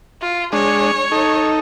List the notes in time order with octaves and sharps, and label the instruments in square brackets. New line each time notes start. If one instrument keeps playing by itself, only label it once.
[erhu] F4
[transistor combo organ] G#3 D4 [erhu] C#5
[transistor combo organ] D#4 A4